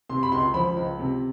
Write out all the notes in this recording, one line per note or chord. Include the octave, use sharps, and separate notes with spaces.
C3 C6
B5
C#2 C6
F3 B5
C#2
C3